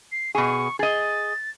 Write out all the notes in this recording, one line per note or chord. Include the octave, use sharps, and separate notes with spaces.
C7
B2 G#4 C#6
G#4 D#5 A6